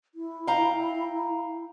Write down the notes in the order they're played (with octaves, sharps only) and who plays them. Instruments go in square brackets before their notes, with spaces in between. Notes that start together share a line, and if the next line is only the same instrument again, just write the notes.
[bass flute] E4
[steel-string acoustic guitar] F5 G5 A#5